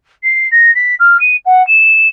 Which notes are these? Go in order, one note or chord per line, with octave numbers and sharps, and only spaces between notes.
C7
A#6
B6
F6
D#7
F#5
E7